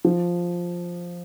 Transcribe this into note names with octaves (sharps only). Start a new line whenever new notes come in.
F3